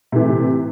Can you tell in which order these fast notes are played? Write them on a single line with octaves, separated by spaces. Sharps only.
C3 E3 A2